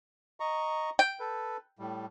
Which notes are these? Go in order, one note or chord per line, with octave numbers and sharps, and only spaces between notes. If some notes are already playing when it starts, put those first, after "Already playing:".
D#5 A#5 C#6
G5
A4 B4
A2 G3